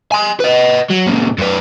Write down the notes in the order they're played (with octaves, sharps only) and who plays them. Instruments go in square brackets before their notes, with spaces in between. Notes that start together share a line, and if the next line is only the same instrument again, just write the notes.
[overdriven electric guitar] G#5 C6
B4 D#5
F#3
A#2 C#3
F#2 B4